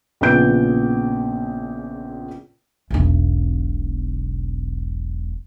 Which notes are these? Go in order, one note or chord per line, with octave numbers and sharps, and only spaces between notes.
A#1 A#2 C#3 B3 G6 D7
E1 B1